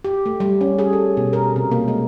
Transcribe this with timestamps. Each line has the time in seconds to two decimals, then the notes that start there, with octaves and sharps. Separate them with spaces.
0.04 G4
0.26 A3
0.40 G3
0.61 C#4
0.79 G#4
0.93 A4
1.17 B2
1.33 A#4
1.56 C3
1.71 A#3
1.88 G#3